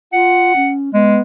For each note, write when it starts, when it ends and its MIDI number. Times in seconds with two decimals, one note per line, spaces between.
0.13 0.53 65
0.13 0.71 78
0.56 0.93 61
0.94 1.19 56
0.94 1.21 59